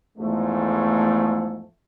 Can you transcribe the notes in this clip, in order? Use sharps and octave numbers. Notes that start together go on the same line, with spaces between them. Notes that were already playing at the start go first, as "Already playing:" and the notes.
E2 G#2 F3 A3